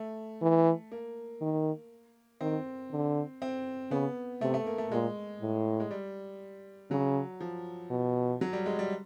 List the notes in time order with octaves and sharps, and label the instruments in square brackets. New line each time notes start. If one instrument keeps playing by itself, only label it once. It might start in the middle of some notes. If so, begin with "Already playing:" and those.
Already playing: [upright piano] A3
[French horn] E3
[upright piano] A#3
[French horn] D#3
[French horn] D#3 [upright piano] C4
[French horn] D3
[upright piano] C4
[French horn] C#3 [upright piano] B3
[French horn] C3 [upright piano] A3
[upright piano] A3
A#3
A3
[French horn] A#2 [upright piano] G#3
[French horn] A2
[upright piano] G#3
G3
[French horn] C#3 [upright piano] F#3
[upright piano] F3
[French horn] B2
[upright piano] F#3
G3
G#3
G3